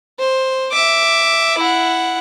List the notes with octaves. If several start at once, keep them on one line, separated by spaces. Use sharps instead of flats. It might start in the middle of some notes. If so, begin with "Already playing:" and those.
C5
E5 D6
E4 F#5